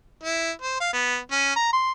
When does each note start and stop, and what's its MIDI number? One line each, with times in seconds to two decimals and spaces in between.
0.23 0.51 64
0.62 0.80 72
0.81 0.91 77
0.93 1.18 59
1.31 1.55 61
1.56 1.68 82
1.73 1.92 84